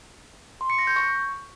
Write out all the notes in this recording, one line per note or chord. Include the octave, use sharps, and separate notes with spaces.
C6
C#7
A#6
G6
C#6